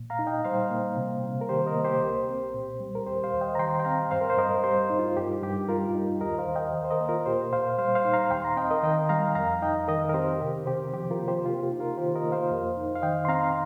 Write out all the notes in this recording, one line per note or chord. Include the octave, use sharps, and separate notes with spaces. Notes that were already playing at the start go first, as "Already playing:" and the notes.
Already playing: A#2
F5 A#5
D#4
D#5 G5
G3 C5 F5
A#3
C3
C3
A#4
D#3 G4 C5
A#4 D#5
A#3
G4 C5
C2
C4
A#2
G3
A#4
D#2 G4 C5
C5 F5
D#2
D#5 G5
A#5
D#3 G5 C6
G5
C4 F5 A#5
G2 C5 F5
A#4
C5
G2 A#4 D#5
G3 G4 C5
D#4
F4
G2 G4
G2 G4
G3 F4 A#4
D#4
D#2 A#4 D#5
C5 F5
D#2
D#5 G5
D#3
C5
A#4 D#5
A#3
F4 A#4
A#2 G4 C5
A#2 C5 F5
G3 C5 F5
C5 F5
D#4
F5 A#5
D#2 G5 C6
F5 A#5
C4 D#5 G5
A#4 D#5
D#3 D#5 G5
G3 F5 A#5
F2 F5 A#5
D#4 D#5 G5
D#3 A#4 D#5
A#4
C4 G4 C5
C3 G4
C3 G4 C5
F3 G4
F4 A#4
A#3
G4 C5
C3 F4
G4
D#4
F4 A#4
D#3 G4 C5
A#4 D#5
A#3
C5 F5
F2
D#4
F5
D#3 D#5 G5
C6
C4 F5 A#5